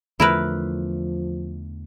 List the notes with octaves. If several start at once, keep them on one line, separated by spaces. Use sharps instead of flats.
E2 D3 F3 A3 E4 A#4 B4